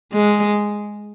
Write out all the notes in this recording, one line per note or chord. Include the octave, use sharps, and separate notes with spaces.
G#3